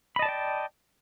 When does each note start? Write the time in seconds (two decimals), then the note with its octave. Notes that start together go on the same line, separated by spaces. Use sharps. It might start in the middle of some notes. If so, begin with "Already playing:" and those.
0.16 B5
0.19 D#5
0.22 A5
0.25 D5
0.29 G5